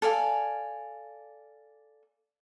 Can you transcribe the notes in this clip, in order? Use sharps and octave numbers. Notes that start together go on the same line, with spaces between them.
A4 D5 F5 G#5